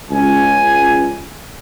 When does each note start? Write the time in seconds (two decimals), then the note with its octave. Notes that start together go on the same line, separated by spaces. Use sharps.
0.11 C#2 G#5